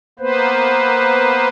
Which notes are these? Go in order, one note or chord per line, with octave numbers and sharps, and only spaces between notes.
A#3 B3 B4 C5